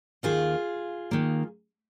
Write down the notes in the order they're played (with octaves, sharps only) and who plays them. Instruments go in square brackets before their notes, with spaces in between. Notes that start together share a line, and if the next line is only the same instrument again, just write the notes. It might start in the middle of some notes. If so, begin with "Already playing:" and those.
[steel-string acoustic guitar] D#2 D#3 A#3 F4 G#4
D#2 D#3 A#3